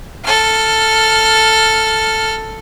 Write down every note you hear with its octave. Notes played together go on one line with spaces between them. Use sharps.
A4 F6